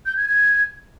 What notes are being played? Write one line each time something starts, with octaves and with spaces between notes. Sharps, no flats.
G6
G#6
G#6